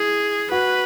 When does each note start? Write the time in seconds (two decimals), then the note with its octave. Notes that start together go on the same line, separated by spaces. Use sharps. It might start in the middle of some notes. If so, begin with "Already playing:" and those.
Already playing: E4 G#4
0.51 F#4 B4